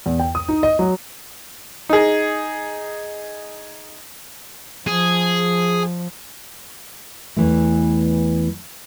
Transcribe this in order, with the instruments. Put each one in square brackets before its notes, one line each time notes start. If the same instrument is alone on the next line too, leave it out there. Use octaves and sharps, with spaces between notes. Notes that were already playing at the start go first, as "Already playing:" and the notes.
[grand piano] E2
G5
D#6
D#4
D#5
F#3
[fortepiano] D#4 G#4
[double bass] F3 [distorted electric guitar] G#4
[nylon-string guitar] E2 E3 A3